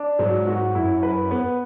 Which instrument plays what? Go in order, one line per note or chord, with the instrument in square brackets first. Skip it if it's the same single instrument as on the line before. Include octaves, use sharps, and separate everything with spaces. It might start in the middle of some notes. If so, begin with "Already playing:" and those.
Already playing: [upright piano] D4
[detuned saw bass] G#2 [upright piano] F#3
[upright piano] F#4
[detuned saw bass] F#2 [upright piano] E4
[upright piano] B4
B3